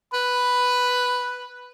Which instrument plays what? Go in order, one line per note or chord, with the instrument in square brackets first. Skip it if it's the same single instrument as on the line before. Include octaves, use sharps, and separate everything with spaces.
[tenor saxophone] B4 [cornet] B5